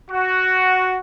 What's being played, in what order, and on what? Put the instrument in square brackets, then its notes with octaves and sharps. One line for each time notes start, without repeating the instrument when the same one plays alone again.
[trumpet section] F#4